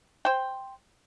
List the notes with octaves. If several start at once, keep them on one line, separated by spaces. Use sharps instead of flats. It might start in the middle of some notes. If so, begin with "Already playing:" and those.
C5 G5